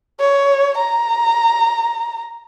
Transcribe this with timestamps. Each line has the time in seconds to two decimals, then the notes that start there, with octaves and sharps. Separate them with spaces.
0.20 C#5
0.78 A#5